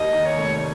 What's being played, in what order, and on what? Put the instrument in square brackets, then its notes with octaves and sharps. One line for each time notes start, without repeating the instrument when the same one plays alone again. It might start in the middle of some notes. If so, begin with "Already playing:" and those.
Already playing: [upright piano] D#2 [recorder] D#5
[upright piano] D#3
[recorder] C#5
[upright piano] F1